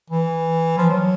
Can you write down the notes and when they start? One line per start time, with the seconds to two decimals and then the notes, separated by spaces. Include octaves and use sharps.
0.10 E3
0.78 F3
0.89 F#3